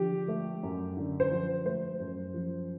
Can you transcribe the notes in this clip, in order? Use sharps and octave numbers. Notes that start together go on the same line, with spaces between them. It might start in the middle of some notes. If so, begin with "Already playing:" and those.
Already playing: D3 F3 G4
A3
F#2
D3
C5
F3
A3 C5
F#2
F3